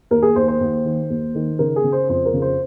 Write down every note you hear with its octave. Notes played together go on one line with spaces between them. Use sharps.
D#2 A#4
G#4
D#2 C5
C5
D#2
D#3
D#2
D#3
C#3 A#4
G#4
C#3
C5
F2 C5
A#4
C#3
C5